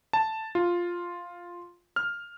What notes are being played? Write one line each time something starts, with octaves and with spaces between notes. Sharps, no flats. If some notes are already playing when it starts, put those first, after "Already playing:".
A5
F4
F6